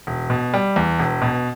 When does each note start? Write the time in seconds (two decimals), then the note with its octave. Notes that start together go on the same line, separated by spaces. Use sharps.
0.07 E1
0.30 B2
0.54 G3
0.76 E2
0.99 E1
1.22 B2